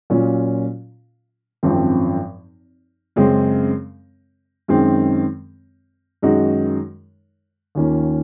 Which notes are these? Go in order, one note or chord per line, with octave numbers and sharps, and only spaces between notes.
A#2 F#3 C#4 F4
G#1 F#2 F3 C4
F#2 C#3 G#3 C4
F#2 D#3 G#3 C4
F#2 D#3 G#3 D#4 F#4
D#2 D#3 A#3 C#4 F4